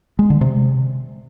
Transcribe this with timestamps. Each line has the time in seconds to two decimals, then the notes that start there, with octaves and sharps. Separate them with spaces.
0.19 G#3
0.30 D3
0.41 C3